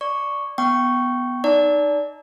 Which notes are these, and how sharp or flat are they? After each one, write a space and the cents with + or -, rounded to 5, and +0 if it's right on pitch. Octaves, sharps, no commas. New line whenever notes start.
D5 +0 C#6 +0
B3 +0 G5 -20 C#6 +0
D#4 -15 D5 -25 A#5 -20